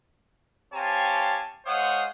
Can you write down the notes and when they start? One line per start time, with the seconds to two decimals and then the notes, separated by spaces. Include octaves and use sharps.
0.74 C4 G4 C#5 F5 G#5 A5
1.66 G#3 C5 C#5 F5 F#5 D#6